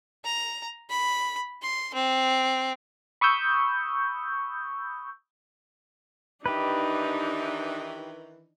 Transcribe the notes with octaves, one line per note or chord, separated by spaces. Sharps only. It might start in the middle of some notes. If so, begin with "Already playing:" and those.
A#5
B5
C6
C4
B5 C#6 D#6 E6 G6
D#3 E3 D4 D#4 G4 B4